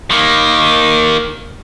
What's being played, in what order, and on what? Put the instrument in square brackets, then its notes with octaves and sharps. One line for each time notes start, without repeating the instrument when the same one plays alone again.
[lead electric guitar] D#3 A#3